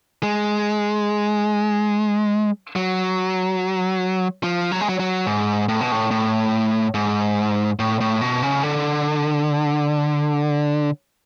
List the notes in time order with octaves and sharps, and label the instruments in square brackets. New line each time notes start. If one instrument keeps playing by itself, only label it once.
[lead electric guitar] G#3
F#3
F3
F#3
G#3
F#3
F#3
G#2
A2
B2
A2
A2
G#2
A2
A2
B2
C#3
D3